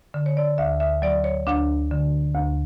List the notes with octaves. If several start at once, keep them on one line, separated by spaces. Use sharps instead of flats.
D3
C#5
D5
D2 E5
E5
F#3 D5
C#5
D2 D4
D3
D2